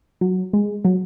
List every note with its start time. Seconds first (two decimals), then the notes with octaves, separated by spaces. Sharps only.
0.21 F#3
0.53 G#3
0.85 F#3